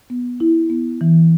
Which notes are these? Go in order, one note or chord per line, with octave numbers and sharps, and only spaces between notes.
B3
E4
B3
E3